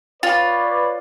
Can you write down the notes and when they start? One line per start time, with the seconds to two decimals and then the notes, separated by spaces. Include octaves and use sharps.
0.23 F4 B4 C#5 D5